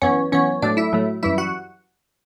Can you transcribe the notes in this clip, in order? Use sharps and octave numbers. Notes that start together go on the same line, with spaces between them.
F#2 E3 B3 C#4 C#5
F#2 E3 B3 C#4 C#5
A2 F#3 A3 D4 D5
E4 E5
A2 F#3 A3
F#2 E3 G3 E4 E5
F#4 F#5